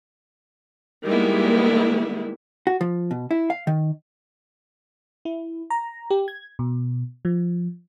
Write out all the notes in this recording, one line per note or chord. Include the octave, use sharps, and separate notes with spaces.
D#3 G3 G#3 A#3 B3 E4
F#4
F3
B2
E4
F5
D#3
E4
A#5
G4
G#6
B2
F3